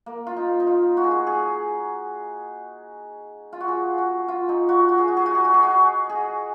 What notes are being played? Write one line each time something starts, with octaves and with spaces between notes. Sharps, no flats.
A#3
F4
D#4
D#4
F4
F#4
G#4
F#4
G#4
F4
F#4
G#4
F#4
F4
D#4
F#4
F#4
G#4
F#4
G#4
F#4
G#4
F#4
G#4
F#4
G#4